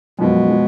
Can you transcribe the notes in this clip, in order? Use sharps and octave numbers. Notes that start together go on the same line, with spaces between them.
F#2 B2 F3 G#3
F3 G#3